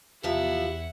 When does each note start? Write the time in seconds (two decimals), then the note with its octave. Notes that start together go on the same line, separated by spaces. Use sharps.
0.23 E2 C3 F3 E4 G4 E5 F#5